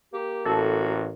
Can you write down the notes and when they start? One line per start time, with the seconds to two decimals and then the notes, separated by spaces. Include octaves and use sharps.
0.13 A#3 G4
0.45 A1 F#4 A4